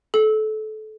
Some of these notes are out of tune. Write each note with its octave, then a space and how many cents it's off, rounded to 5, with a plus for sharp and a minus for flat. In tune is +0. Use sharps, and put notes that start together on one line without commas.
A4 -25